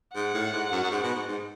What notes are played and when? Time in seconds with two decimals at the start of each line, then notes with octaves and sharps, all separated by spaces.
0.15 G#2 F#5
0.34 A2
0.53 G#2
0.72 F#2
0.84 F#2
0.91 G#2
1.03 B2
1.15 G#2
1.28 G#2